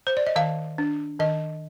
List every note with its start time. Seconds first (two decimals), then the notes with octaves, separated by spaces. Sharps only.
0.07 C5
0.17 D5
0.27 D#5
0.36 D#3 F5
0.78 D4
1.20 D#3 D#5